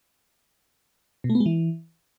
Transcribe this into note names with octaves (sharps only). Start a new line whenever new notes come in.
B2
A3
B3
G#3
E3